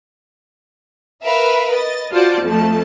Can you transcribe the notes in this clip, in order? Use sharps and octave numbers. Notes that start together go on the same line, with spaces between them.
A#4 B4 E5 F5
D#5 A6
F4 F#4 C5 D5 A5
F2 F3 A3 A5